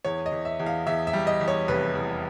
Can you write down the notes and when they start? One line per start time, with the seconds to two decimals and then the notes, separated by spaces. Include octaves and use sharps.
0.05 E2 C#5
0.26 D#5
0.32 E2
0.45 E5
0.60 E2
0.66 F5
0.87 E2 E5
1.07 E5
1.13 G3
1.27 D#5
1.41 E2
1.48 C#5
1.68 F1 B4
1.95 E2